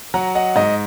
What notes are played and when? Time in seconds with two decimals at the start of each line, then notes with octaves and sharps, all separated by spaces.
0.14 F#3 F#5 A#5
0.35 D#5 F#5
0.56 G#2 D#5